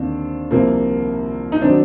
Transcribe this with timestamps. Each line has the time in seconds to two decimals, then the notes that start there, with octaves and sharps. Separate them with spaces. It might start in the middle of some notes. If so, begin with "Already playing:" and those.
Already playing: D#2 D3 C4 D4
0.51 C2 C3 F3 A#3 C4
1.52 D#4
1.62 D#3 F#3 C4 D4